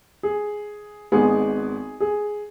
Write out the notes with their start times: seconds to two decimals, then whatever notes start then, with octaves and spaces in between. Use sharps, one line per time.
0.23 G#4
1.12 G#1 G#2 G#3 B3 G#4
2.00 G#4